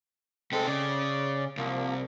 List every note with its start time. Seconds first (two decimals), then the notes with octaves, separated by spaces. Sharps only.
0.52 C2 G#3 C4 A4
0.67 C#3 D5
1.57 C2 F3 A#3